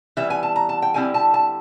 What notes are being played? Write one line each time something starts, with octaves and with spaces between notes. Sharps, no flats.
E3 G3 B3 E5
G#5
A5
A#5
A5
G5
D3 G3 C4 E4 G#5
A5
A5